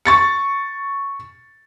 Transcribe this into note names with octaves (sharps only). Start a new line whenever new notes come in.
C#6 A6 C#7